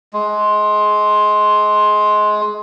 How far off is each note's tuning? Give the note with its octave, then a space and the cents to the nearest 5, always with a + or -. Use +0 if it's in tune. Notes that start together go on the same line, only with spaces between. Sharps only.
G#3 +20